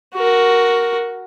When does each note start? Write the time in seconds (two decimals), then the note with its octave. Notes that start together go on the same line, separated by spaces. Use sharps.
0.15 F#4 A#4